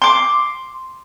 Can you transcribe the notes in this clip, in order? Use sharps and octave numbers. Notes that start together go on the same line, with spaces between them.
C6 D6